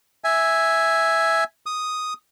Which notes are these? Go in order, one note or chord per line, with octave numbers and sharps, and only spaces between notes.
E5 G#5
D#6